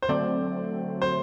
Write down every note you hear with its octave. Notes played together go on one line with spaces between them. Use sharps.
C5
D3 F#3 A3 C4 D5
C5